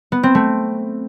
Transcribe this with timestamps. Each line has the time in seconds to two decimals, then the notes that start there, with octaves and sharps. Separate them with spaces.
0.12 B3
0.23 C4
0.35 A3